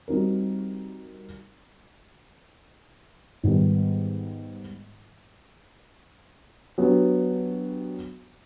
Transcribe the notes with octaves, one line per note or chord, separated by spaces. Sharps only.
G3 C4 D#4 F#4 A#4
G#2 D#3 G3 B3
F#3 B3 D4 G4